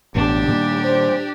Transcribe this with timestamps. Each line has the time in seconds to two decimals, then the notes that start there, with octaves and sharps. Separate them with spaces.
0.15 A1 B2 D4 G4
0.48 A#2 D#3 G3 A#3
0.83 C5